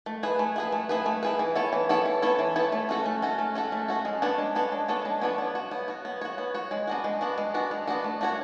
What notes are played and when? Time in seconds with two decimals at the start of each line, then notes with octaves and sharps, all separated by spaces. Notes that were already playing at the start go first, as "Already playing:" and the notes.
0.06 A3
0.23 E4 G#4 B4
0.39 A3
0.56 E4 G#4 B4
0.72 A3
0.89 E4 G#4 B4
1.06 A3
1.23 E4 G#4 B4
1.39 E3
1.56 B3 E4 A4 C#5
1.73 E3
1.89 B3 E4 A4 C#5
2.06 E3
2.22 B3 E4 A4 C#5
2.39 E3
2.56 B3 E4 A4 C#5
2.72 A3
2.89 C#4 F#4 A4
3.06 A3
3.22 C#4 F#4 A4
3.38 A3
3.55 C#4 F#4 A4
3.72 A3
3.88 C#4 F#4 A4
4.05 G#3
4.22 B3 D4 A4 C#5
4.38 G#3
4.55 B3 D4 A4 C#5
4.72 G#3
4.88 B3 D4 A4 C#5
5.05 G#3
5.21 B3 D4 A4 C#5
5.38 B3
5.55 F#4 C#5
5.71 B3
5.88 F#4 C#5
6.05 B3
6.21 F#4 C#5
6.38 B3
6.54 F#4 C#5
6.71 G#3
6.87 B3 D4 F#4
7.04 G#3
7.21 B3 D4 F#4
7.38 G#3
7.54 B3 D4 F#4
7.71 G#3
7.87 B3 D4 F#4
8.04 A3
8.21 D4 F#4 C#5